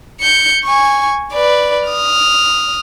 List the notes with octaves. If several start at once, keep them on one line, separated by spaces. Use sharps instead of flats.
G6 C#7
G#5 C#6
B4 D5
D#6 F6